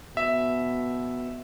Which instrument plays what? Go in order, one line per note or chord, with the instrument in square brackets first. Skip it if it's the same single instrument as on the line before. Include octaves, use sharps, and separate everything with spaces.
[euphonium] B2 [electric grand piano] E5